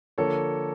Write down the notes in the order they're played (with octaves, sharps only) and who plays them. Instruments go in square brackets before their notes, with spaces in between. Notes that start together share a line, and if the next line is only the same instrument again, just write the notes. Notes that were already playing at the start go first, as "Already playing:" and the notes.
[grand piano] D3 F3 A#3 A4 C#5